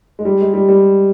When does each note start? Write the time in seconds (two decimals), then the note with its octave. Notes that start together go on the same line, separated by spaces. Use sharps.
0.19 G#3
0.25 G3
0.41 G#3
0.54 G3
0.69 G3